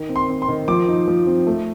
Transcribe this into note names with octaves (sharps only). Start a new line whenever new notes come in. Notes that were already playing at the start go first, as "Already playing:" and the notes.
Already playing: D#3 D#4
C4
C6
C4
C6
D#3
F3 D6
D#4
F3
C4
A3